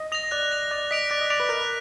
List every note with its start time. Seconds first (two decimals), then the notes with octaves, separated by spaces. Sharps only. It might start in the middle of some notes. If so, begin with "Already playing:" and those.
Already playing: D#5
0.12 D#5 A#6 F7
0.31 D5 F#6
0.52 A#6 F7
0.71 D5 F#6
0.91 D#5 B6 D7 F7
1.10 D5 F#6
1.21 D#5
1.30 D5 B6 D7 F7
1.40 B4
1.49 A#4 F#6